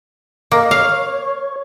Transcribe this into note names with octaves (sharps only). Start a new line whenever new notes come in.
A#3 D#5
C#5 F5